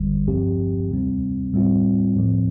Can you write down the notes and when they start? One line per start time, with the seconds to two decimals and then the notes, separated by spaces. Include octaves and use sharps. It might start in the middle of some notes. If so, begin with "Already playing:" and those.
Already playing: G1 F2 D3 G3
0.27 G2 F3 C4 G4
0.90 D2 C3 G3 C4
1.53 A2 G3 C4 F4
2.16 A2 F3 C4